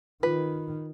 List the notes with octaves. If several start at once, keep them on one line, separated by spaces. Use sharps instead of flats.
D#3 F4 B4